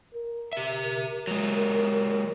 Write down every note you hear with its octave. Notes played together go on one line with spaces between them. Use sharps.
A#4
G4 E5
F#3 G#3